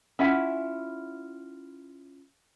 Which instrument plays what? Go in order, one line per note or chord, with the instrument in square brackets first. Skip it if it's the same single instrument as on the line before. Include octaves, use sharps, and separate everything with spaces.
[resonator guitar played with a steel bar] C#4 E4 F4 E5 F#5